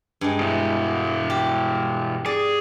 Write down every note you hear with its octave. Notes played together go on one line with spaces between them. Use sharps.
G2 G#3
B2 E4
G4
G#4 D5